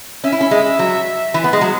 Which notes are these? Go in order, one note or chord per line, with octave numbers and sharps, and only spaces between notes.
C#4 E5
E4
C#4
G#3
F#3
E3
B3
G#3
F#3